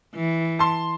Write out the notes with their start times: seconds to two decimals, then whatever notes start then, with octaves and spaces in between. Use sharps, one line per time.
0.15 E3
0.59 A5 C6